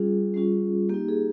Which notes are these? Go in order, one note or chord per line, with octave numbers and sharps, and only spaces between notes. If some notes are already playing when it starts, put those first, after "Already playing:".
Already playing: G3 C#4 F4 G#4
G3 C#4 F4
A#3 D#4 G4
G#4